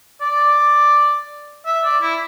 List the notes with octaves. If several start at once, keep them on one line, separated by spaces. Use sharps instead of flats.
D5
E5
D5
E4